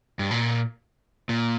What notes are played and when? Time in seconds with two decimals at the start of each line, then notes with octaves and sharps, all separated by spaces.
0.19 G2
0.31 A#2
1.29 A#2